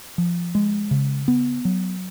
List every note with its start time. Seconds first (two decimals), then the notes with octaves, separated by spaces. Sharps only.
0.18 F3
0.55 G#3
0.91 C#3
1.28 B3
1.65 F#3